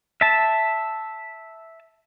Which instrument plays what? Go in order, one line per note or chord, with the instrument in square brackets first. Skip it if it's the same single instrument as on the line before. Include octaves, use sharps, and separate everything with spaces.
[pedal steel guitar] E5 A5